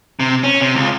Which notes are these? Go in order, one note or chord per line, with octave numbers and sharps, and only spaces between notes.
C3
C#4
C3
C#2